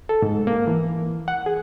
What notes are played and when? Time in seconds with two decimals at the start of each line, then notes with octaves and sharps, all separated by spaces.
0.09 A4
0.22 G#2
0.47 A#3
0.67 E3
1.28 F#5
1.46 G#4